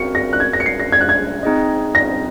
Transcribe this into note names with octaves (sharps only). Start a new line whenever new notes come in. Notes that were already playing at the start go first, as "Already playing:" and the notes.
Already playing: C4 F#4 A#4 F5 C#7
A#6
F#6
G#6
A#6
C#7
C7
A#6
G#6
F#6
G#6
C4 D#4 G#4 D#5
A#6